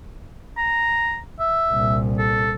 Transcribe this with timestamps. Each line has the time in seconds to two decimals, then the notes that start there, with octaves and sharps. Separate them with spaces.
0.58 A#5
1.40 E5
1.70 C2 A#2
2.18 A4